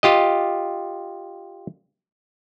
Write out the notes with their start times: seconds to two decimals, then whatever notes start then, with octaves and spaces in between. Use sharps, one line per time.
0.03 F4 G4 D#5